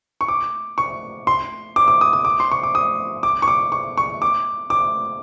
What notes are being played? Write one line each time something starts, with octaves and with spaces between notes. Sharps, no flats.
C#6
D6
C#6
C6
D6
D6
D#6
D#6
D6
C6
C#6
D6
D#6
D6
C#6
D6
C#6
C#6
D6
D6